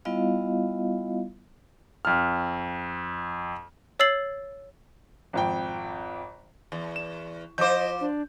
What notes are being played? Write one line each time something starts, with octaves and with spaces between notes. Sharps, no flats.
G3 B3 E4 F4 D#5 F5
F2 F6
C#5 E6 A6 C7 F#7
G#1 F2 G5
E2
E7
F3 C5 D#5 D6 G6
D4